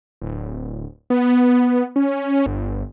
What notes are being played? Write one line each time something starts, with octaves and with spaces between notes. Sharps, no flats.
D1
B3
C#4
G1